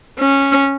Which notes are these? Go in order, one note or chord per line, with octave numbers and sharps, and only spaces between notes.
C#4